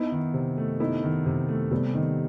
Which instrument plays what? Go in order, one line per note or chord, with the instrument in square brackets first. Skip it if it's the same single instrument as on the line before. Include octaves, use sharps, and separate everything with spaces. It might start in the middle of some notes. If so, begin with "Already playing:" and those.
Already playing: [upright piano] B3 D#4 [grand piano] E4
[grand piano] D#3
C3
A3
[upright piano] B3 D#4 [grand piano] E4
[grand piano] D#3
C3
A3
[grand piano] C3 [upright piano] G3 B3
[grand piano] D#3